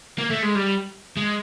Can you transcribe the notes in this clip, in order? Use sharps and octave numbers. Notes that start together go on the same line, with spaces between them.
A#3
A3
G#3
G3
G#3